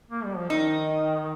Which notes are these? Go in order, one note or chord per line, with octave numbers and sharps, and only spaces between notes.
A#3
G3
F3
D#3 D#4